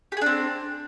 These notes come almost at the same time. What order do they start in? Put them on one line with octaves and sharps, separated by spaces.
G4 G#4 D4 C4